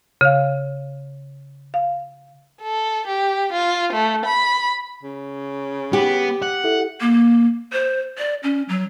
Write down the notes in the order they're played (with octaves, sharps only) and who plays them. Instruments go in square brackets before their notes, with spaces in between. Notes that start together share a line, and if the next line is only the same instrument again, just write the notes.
[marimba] C#3 F5
F5
[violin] A4
G4
F4
A3
B5
[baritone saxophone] C#3
[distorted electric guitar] B3 [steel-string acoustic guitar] G4
[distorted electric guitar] F#5
[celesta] E4 A4 E5
[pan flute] A#3
C5
D5
C#4
F#3